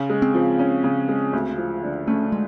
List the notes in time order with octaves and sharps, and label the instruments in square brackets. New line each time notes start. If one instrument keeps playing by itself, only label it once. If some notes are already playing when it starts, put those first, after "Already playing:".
Already playing: [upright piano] C#3
G#3
[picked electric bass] C4
[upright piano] F3
C#4
C#3
G#3
D2
F3
D3
[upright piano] A3 [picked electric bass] C#4
[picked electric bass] G#3